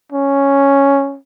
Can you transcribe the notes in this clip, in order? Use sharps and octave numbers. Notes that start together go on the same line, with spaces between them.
C#4